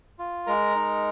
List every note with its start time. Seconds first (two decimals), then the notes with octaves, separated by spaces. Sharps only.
0.19 F4
0.47 G#3 A#4 A#5
0.76 D#4